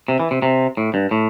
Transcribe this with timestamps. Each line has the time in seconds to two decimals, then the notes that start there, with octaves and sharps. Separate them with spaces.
0.08 C3
0.20 E3
0.31 C3
0.42 C3
0.77 A2
0.94 G2
1.11 A2